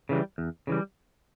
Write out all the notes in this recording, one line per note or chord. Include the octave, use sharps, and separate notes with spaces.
C#3 E3 G3
E2
C#3 E3 G3